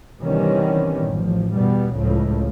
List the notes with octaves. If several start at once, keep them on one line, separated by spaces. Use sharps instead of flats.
C3 D#3 E3 G3 B3 C#4
A1 F3
E2 B2 G3 B3
C#2 A2 C#3 F3 A3